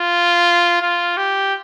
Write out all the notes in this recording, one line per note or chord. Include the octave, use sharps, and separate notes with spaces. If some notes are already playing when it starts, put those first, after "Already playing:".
Already playing: F4
F4
G4